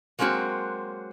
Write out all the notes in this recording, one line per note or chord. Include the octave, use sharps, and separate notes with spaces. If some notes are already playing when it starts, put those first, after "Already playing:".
F#3 G#3 A#3 C4 F#4